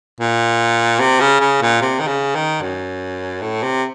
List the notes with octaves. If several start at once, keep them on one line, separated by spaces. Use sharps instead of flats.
A#2
C3
C#3
C#3
A#2
C3
D#3
C#3
D#3
F#2
A2
C3